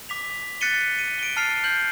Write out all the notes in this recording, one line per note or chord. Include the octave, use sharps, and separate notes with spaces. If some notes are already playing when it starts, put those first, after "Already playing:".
D6 B6 F7
F#6 A6 B6 C#7 D#7 G7
D#7
D7 G7
A5 F6 A6 C7 F7
F6 G6 F#7